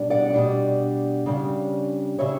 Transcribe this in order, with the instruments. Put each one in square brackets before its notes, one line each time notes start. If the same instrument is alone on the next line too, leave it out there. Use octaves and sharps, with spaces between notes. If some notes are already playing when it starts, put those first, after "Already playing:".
Already playing: [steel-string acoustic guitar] B2 G3 D4
D5 F#5
B2 G3 D4
C#3 G3 D4
C#3 G3 D4 C#5 E5